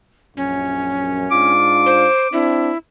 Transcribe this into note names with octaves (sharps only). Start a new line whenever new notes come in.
A#1 F#2 C#4
G#2 D4 F4 D6
C5
C4 D4 E4